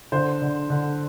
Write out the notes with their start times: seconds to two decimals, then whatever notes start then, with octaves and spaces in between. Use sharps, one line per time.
0.12 D3 C5
0.42 D3
0.70 D3